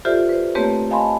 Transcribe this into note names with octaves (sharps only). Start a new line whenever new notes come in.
F4 G4 A4 C5 D5 E5
B4 C5
A3 A#3 C4 G4 B4 C#5
D#5 F5 G#5 A5 B5 C6